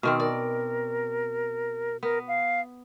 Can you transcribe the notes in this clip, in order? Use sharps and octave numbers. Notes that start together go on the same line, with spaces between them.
B2 D#3 C4 F6
A#4 D5
B3 A#4
F5